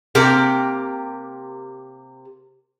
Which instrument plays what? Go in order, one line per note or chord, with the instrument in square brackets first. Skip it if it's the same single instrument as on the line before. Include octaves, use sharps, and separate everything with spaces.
[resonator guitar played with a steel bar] C3 A#3 G4 A#4